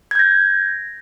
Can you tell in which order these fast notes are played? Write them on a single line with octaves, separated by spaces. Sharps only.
G#6 G6 A#6